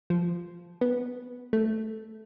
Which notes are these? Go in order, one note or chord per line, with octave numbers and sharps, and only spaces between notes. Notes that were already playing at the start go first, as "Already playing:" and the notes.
F3
B3
A3